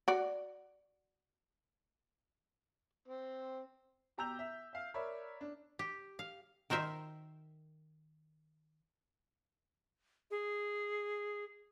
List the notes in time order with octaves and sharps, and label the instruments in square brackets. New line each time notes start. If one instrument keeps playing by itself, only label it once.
[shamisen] F#4 D5
[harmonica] C4
[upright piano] B2 G4 A#5 E6 G6 F7
E5
E5 F5
A#4 C#5 D5 E5 B5
D4
[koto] G4
F5
D#3 A#4 C5 E5
[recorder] G#4